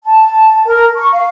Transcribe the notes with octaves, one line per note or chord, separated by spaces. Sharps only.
A5
A#4
C#6
F5